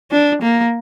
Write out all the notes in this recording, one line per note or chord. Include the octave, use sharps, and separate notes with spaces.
D4
A#3